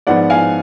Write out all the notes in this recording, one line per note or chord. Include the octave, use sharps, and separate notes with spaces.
G#2 F3 B3 D5 F#5
F5 G#5